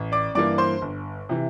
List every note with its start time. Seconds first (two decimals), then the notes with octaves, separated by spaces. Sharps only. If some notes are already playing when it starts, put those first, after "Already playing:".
Already playing: A1
0.12 D5 D6
0.35 G2 E3 A#3 D5 D6
0.58 C5 C6
0.82 G1
1.29 C3 E3